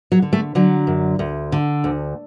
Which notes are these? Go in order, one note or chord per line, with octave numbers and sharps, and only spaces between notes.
F#3
D3
A3
D3 F#3
F#2
D2
D3
D2